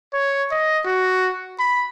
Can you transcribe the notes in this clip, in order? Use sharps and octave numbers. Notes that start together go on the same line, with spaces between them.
C#5
D#5
F#4
B5